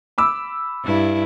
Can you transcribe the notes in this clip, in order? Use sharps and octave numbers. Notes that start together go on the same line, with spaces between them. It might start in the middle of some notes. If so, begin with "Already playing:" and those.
B5 D6 E6
G2 E4